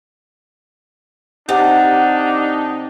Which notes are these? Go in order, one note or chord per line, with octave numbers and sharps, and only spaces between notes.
C3 D4 D#4 F#5